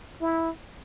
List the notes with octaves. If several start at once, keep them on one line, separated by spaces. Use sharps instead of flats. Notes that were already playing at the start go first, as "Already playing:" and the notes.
E4